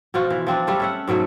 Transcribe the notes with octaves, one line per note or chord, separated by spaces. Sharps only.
B2 F3 F4 F#4
E3
F3 C4 D4
G3 A3 F4
C#4 E5 F#5
G#2 B2 F#3 A3